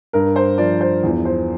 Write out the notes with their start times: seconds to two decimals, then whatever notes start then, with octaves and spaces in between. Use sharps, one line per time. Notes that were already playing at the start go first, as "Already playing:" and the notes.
0.13 G2 A#4
0.36 C5
0.58 F3 D5
0.81 C5
1.03 E2
1.25 C5